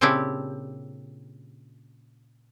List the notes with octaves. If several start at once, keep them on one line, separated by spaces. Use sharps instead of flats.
A#2 C#3 C4 D4 E4 G4